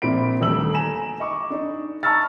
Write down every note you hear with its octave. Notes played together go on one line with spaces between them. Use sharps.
A#1 A#2 C4 B5 D7
D#1 D2 E6 F#7
G#5 A#5 E7
D#5 C#6 D6
D4 D#4
A5 A#5 C#6 E6 F6 A6